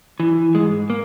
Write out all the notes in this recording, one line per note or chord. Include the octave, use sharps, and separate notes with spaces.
E3
G#2 G#3
A#3